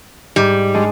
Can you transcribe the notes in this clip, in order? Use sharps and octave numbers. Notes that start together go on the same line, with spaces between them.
G#2 G3
G#3 D4 G#4